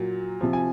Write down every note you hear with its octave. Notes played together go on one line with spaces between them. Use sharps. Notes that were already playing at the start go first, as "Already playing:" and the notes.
Already playing: A#2 F#3
C3 F3
G#5